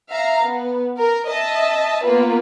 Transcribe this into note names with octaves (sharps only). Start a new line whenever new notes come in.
E5 F5 A#5
B3
A#4
D#5 E5 A5
A#3 B3 F4 B4